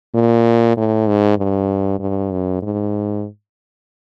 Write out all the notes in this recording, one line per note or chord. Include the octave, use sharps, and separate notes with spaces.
A#2
A2
G#2
G2
G2
F#2
G#2